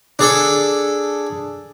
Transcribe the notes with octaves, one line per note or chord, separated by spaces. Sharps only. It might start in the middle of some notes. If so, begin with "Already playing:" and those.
D4 G#4 A4